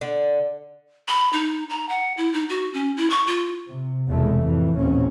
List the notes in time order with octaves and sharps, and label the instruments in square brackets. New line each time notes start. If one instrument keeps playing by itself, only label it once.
[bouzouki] D3
[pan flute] B5
D#4
A#5
F#5
E4
D#4
F#4
C#4
E4
C#6
F4
[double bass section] C3
F1 E2 B2 G#3 A3
F2 A2 E3
A1 D#2 A#2 C4 C#4